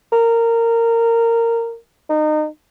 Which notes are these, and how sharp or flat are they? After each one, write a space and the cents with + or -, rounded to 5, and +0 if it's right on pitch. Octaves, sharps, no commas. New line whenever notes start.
A#4 -15
D#4 -30